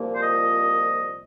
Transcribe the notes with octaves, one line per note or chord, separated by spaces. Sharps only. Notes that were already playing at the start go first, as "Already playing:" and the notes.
Already playing: C2 A#2 F3 A#3
C5
D#5